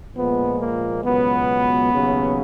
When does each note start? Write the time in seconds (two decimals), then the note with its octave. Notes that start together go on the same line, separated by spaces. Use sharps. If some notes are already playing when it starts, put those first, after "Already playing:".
0.16 A#2 F3 G#3 B3
0.60 A#3
1.05 C#2 B2 F#3 B3
1.93 D#2 C#3 F#3